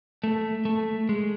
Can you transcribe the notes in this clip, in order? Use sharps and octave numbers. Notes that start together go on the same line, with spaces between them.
A3
A3
G#3